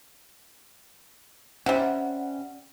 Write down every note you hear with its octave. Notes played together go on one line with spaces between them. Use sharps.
C3 G3 C#4 F#5